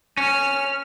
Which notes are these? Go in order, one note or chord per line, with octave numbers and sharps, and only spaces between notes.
C#4 F6